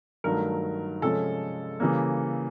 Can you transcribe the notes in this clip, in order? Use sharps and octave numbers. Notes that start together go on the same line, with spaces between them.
G2 D#3 F#3 A3 A#4
C3 F3 G#3 C#4 A4
C#3 E3 G3 A#3